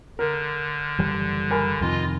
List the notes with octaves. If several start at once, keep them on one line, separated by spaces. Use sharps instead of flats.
D3 A#4
F#1 E3 G3
A#4 G#5 B5
F2 C3 D#3 F4 D#5